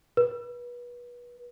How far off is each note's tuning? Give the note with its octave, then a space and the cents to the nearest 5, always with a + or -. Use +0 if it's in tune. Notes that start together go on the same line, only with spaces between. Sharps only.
B4 -30